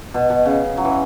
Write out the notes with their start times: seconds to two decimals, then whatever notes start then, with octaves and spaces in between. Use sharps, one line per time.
0.14 B2
0.30 B2
0.46 C#3
0.77 F#3
0.85 E3